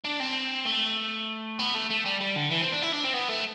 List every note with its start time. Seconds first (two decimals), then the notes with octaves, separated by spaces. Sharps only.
0.04 D4
0.20 C4
0.66 A3
1.59 B3
1.75 A3
1.90 A3
2.06 G3
2.21 G3
2.37 D3
2.52 E3
2.62 C4
2.73 D4
2.83 E4
2.93 D4
3.04 C4
3.14 B3
3.29 A3